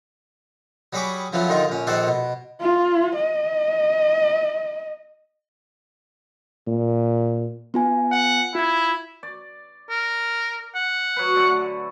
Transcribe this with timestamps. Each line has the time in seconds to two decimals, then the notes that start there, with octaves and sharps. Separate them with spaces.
0.93 F#3 G3 G#4 B5 C#6 D6
1.33 C#3 F3 F#3 A3 B3
1.49 G2 D3 D#3 D#4 F4
1.69 A#1 C#4
1.87 A#1 D#3 A4 C5 D5 F#5
2.07 B2
2.61 F4
3.16 D#5
6.67 A#2
7.74 B3 F4 G#5
8.12 F#5
8.55 E4 F4 G#6
9.23 D5
9.90 A#4
10.75 F#5
11.16 F#3 B4
11.35 D3 A3